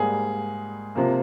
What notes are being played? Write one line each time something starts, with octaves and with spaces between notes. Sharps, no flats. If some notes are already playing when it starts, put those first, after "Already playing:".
Already playing: G#2 G3 A#3 G#4
C3 F3 A#3